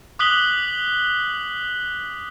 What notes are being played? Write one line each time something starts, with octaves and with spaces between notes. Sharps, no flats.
D6 D#6 F#6 B6 F#7 G7